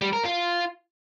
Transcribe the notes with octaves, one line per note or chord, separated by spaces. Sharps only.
G3
A#4
F4